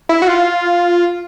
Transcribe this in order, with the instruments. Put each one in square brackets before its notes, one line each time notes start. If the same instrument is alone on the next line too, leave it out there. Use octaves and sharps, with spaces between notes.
[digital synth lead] E4
F#4
F4